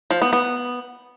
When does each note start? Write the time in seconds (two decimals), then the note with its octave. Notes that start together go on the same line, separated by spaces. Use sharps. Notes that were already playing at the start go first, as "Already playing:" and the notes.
0.11 F3
0.22 B3
0.33 B3